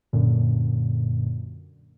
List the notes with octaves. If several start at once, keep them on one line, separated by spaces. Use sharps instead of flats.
F#2 A#2 D3